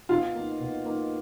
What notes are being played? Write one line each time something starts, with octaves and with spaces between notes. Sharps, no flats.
B2 F4
A#3 D#4
B2
A#3 D#4